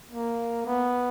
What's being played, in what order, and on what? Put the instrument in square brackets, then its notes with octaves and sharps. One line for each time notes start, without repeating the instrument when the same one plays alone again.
[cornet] A#3
B3